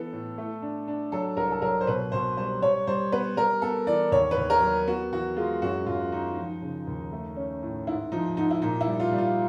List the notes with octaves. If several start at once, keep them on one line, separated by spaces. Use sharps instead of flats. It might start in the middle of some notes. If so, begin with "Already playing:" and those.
Already playing: E3 B3 A4
A2
A3
D4
D4
F#3 A4
C2 A#4
A4
F#3 A#4
C5
B2 B4
B2 C5
G3 C5
G3 C#5
G3 C5
B3 B4
G3 A#4
B3 A4
E3 D5
D#2 C#5
B4
D#2
A#4
F#3
B3 F#4
E3 F#4
G#3 F4
F#2 F#4
F#2 F4
D#3 D#4
F3
C#3
D#2
A3
C#4
A2
G#2 E4
F3 D#4
G#2 D#4
E4
A#2 D#4
E4
G3
F4
G3
F4